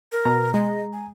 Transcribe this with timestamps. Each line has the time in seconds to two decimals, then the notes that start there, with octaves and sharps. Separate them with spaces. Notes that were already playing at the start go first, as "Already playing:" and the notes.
0.12 A#4
0.25 B2 A#5
0.54 G#3 D#5
0.93 G#5